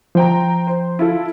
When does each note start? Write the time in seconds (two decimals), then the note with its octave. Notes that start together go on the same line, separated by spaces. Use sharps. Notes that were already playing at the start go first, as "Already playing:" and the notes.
0.15 F3 C5 G5 A#5
0.67 C5
0.99 E4 F4 A4